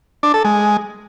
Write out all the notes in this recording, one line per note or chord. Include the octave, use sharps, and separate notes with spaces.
D4
A4
G#3